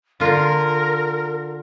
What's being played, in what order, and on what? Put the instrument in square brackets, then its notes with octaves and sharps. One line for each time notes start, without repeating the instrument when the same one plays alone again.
[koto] D3 F4 [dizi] A#4